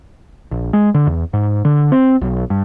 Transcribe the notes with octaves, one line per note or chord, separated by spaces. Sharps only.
A#1
G#3
D3
E2
G#2
D3
C4
B1
G2